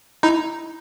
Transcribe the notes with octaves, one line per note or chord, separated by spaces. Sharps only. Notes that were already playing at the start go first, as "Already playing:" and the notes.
D#4 E4